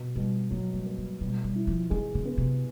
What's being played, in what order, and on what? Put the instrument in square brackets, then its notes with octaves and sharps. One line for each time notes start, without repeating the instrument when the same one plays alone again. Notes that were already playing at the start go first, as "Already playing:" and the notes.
Already playing: [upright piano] B2
[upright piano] B2 [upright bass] G3
[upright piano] F#3 [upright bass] G#3
[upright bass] G3
[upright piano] A#3
[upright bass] G3
[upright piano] B2 [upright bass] G3
[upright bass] G3
[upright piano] E4
[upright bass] F3
[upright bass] D#3 [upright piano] G#3
[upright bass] C#3
[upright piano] B3
[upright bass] C3